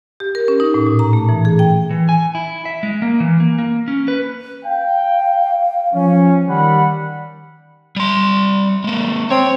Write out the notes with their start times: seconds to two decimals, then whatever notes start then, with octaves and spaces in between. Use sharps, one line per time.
0.20 G4
0.35 A#4
0.48 C#4
0.60 D#4
0.74 A2
0.87 A#2
0.99 A#5
1.13 A3
1.29 E3
1.45 G#4
1.59 G5
1.90 E3
2.09 G#5
2.35 E4
2.65 E5
2.83 G#3
3.02 A#3
3.20 E3
3.40 A#3
3.58 A#3
3.88 C#4
4.08 B4
4.64 F5 G5
5.94 F3 C#4
6.48 D#3 G3 F#5 B5
7.96 G3 C6
8.84 G#3 A#3
9.30 C4 C#5